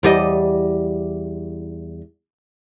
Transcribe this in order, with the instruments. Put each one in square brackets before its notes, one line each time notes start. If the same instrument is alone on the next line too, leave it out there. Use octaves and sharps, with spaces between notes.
[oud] E2 G3 D#5